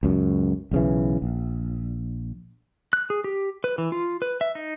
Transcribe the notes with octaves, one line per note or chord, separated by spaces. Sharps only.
C#2 F#2
B1 C#3 E3
A#1
F#6
G#4
G4
B4
E3
F4
B4
E5
D#4